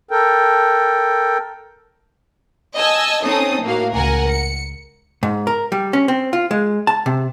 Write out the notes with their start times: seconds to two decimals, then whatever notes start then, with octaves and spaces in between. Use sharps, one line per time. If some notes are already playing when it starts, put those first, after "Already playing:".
0.11 A4 A#4 G5
2.76 D#5 G#5 A5 E6
3.22 C4 C#4 D#4 A4 D#6
3.62 A2 A#3 F#4 F5
3.94 C#2 A#4 F#5 G#5
4.29 C#7
5.23 G#2
5.47 A#4
5.72 G3
5.93 C#4
6.08 C4
6.33 F4
6.51 G#3
6.87 A5
7.06 C3